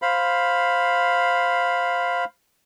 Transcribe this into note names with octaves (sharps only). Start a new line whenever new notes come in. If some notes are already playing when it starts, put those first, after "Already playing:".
C5 F5 B5